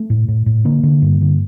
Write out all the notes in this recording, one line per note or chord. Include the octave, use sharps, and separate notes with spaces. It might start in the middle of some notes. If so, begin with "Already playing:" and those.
Already playing: A3
A2
A2
A2
D3 A#3
D3
G2
D3